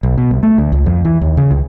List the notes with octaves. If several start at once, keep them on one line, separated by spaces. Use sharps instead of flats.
B1
B2
C2
A3
D2
C#2
F2
E3
D#2
C#3
C#2